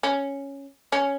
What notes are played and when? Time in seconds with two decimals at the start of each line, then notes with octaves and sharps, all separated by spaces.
0.03 C#4
0.92 C#4